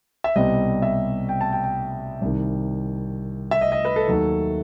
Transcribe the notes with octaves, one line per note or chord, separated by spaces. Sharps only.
E5
C2 B2 G3 C4 D#5
E5
G5
A5
G5
G5
C2 C3 D#3
E5
D#5
D#5
B4
A4
D#2 D#3 F#3 A3